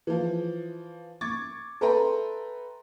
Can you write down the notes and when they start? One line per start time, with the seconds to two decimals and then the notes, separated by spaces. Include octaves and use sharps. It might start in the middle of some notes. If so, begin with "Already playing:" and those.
0.07 E3 F3
1.21 C#6 D6 G#6 A6
1.81 A4 B4 E5 G5 A#5 C6